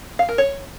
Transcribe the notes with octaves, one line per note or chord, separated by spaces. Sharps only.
F5
A#4
C#5